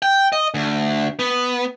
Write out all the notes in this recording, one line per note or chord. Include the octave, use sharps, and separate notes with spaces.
G5
D#5
D2
B3